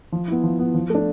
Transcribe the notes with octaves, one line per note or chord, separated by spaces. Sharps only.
F3
B3 E4
F3
B3 E4
F3
A3 D4